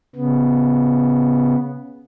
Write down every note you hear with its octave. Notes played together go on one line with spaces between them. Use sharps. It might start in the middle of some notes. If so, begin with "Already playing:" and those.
C#3 B3